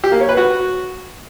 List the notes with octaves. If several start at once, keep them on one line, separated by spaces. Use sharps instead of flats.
G4
A#3
C#5
B4
F#4